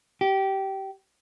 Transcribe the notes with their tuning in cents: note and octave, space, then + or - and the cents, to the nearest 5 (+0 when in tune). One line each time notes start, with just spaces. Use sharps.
G4 -20